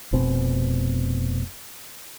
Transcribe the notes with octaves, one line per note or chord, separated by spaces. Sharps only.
F1 B2 C4